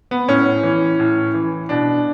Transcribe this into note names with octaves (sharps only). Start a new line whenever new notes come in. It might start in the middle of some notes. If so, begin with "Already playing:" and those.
B3
A2 C#4
E3
A2
E3
B2 D4